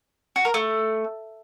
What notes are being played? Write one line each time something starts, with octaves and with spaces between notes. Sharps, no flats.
F#4
A#4
A3